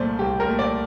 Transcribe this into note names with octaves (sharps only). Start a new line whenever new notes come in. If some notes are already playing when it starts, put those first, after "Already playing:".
Already playing: C2 A#2 A3 C5 D5
C2 G4
A#4
A#2 A3
D5